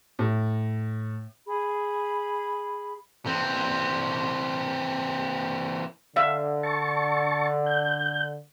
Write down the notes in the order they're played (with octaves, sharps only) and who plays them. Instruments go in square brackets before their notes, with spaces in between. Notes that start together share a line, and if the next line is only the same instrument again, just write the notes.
[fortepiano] A2
[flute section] G#4 B5
[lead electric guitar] E3 C4
[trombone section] D3 [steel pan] E5 F5
[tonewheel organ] A5 C#6
G6